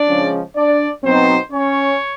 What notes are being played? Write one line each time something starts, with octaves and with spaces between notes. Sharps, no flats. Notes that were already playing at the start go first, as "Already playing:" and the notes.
Already playing: D4 D5
C#3 F3 G#3 C#4
D4 D5
B2 F#3 B3 C4 D#4 C5
C#4 C#5